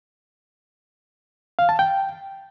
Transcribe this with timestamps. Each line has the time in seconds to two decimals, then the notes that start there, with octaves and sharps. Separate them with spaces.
1.59 F5
1.69 A5
1.79 G5